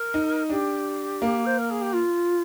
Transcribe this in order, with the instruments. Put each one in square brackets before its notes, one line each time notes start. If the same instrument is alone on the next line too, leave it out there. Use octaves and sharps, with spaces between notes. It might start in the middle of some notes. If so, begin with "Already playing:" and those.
Already playing: [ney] A#4
[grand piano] D#4
[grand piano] D4 [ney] G4
[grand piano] A#3
[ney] C5
A#4
G#4
G4
F4